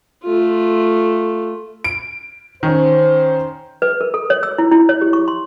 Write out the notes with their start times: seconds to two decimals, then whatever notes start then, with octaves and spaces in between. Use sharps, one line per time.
0.24 A3 F4
1.84 D7
2.63 D#3 C#4 C5
3.82 B4
4.01 A#4
4.14 A4
4.30 C#5
4.43 E6
4.58 E4
4.72 E4
4.89 C#5
5.01 G4
5.13 C#6
5.28 C6